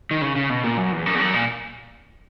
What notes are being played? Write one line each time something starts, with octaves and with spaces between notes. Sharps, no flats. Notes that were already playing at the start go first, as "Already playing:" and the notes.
D#3
C#3
C#3
B2
A#2
F#2
E2
F#2
E2
F#2
A#2